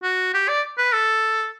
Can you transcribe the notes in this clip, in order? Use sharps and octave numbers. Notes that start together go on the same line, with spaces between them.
F#4
G4
D5
B4
A4